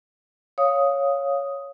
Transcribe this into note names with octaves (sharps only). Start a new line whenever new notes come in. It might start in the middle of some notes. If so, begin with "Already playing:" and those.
C#5 F5 D#6